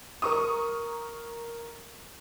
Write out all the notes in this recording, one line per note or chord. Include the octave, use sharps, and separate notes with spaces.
A#4 C#6 D#6